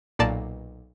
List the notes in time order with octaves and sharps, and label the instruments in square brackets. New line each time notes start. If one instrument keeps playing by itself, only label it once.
[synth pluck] B1 A#2 A#3 D5 A5